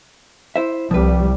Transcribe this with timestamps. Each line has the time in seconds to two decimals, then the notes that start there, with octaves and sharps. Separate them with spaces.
0.56 E4 C5 E5
0.91 C2 F3 G3 B4